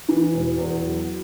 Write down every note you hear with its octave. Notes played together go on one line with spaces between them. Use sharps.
E3
E1
E2
F#3